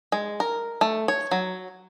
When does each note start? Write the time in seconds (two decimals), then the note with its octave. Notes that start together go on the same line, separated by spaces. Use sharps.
0.12 G#3
0.40 A#4
0.81 A3
1.08 C#5
1.31 F#3